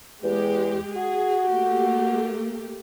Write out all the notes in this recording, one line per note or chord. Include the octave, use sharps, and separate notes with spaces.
E2 G#3 G4
F#4 G#4
A3 A#3 G4